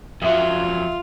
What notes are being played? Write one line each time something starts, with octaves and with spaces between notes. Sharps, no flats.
F2 F#3 F4 E5